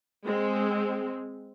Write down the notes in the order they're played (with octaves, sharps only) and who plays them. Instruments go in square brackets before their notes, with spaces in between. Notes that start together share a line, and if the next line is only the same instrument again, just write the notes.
[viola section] G#3 C4